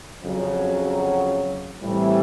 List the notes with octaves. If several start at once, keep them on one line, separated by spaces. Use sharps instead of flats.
F2 C#3 F#3
A2 E3 G3 C4